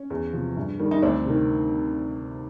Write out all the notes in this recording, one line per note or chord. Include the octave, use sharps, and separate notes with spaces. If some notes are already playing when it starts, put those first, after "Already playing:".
Already playing: C#4
E2
C3 F3
G2
D#3 G3
D#4
D2 C4 D4
C3 D#3